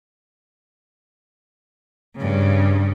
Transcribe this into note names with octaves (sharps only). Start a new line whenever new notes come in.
G2 C#3